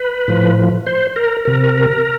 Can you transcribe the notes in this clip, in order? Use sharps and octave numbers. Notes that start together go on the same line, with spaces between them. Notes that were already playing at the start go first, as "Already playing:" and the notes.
Already playing: B4
A2 F3
C5
A#4
C3 A#4